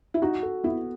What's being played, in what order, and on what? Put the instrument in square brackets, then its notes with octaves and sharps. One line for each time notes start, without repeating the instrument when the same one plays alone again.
[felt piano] E4
[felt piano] D#4 [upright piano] F#4
[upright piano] A4
[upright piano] B3 [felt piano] E4